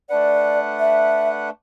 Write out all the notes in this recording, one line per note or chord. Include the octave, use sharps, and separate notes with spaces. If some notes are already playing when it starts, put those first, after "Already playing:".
A3 D4 B4 D5 F#5
E5